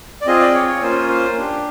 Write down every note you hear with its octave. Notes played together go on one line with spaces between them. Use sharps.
D5
C4 F4 G#4 D#5
D5
C#5
C#5
A#3 C#4 F4 C5
C5
D4 G4